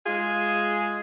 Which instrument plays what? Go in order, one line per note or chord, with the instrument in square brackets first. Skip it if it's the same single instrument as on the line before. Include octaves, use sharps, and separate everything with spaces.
[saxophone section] G#3 F4 G#4